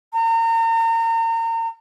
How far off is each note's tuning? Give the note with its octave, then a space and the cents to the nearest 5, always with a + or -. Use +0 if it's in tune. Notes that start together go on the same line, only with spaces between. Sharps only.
A#5 -35